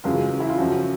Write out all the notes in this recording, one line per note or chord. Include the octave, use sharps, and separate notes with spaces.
F#2 C#3 E3 G#3 F4
E4
F4
F#2 C#3 F3 F#4